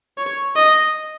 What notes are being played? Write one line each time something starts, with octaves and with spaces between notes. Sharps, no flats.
C#5
D#5